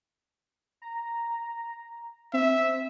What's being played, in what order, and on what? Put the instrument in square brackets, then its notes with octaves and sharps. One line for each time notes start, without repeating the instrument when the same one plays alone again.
[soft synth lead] A#5
[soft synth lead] C4 [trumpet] E5